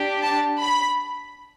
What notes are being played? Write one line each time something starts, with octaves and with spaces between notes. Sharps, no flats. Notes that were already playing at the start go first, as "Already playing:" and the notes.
Already playing: D4 G4
A5
B5